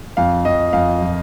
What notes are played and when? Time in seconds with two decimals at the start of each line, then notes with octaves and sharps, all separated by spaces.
0.17 F2 F5
0.45 F2 D#5
0.73 F2 F5
1.01 F3